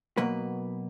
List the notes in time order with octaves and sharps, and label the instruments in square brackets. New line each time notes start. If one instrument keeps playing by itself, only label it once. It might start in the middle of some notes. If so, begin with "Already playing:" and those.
[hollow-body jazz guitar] B2 F#3 A#3 B4